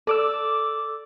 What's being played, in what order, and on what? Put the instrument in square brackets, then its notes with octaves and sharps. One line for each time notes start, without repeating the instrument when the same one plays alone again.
[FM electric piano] A4 D6 E6 [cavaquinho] D5